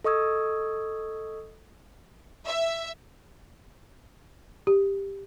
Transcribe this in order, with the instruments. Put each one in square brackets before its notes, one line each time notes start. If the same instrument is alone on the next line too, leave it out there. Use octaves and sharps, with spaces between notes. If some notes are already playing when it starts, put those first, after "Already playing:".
[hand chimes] A4 D#5 C#6 D#6 E6 G#6
[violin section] E5
[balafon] G4